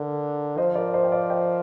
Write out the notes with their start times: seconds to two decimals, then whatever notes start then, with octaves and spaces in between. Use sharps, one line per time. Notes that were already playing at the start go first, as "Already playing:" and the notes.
Already playing: D3 A#4
0.58 F3 C5 D#5
0.75 A#4 D5
0.94 C5 D#5
1.04 G5
1.12 D5 F5
1.30 D#5 G5